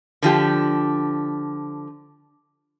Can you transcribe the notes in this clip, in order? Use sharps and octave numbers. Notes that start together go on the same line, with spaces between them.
D3 F3 G4